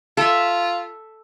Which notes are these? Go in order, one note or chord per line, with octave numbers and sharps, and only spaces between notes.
F4 A4 E5